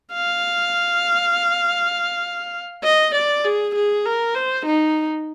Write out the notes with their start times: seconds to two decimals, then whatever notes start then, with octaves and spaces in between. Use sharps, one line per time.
0.13 F5
2.84 D#5
3.14 D5
3.45 G#4
3.75 G#4
4.05 A#4
4.35 C5
4.66 D#4